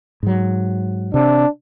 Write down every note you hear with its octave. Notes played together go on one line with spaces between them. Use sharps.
G#2 F#3
C3 D4